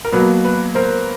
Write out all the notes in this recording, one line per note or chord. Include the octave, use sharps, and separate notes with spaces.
A#4
B2 F#3 A#3 B4
B4
A#4 C5